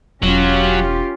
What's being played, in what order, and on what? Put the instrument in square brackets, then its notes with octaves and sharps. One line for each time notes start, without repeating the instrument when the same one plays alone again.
[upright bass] E1 [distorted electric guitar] F#3 [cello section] C#4 F4 G4